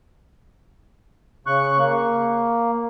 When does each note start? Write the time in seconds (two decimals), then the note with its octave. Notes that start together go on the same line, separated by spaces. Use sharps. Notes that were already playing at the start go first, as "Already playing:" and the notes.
1.47 C#3 C#6 F#6
1.79 A#3